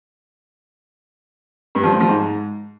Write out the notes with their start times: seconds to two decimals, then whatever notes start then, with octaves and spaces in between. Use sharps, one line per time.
1.75 G2
1.83 F3
1.92 A2
2.00 F3
2.09 G#2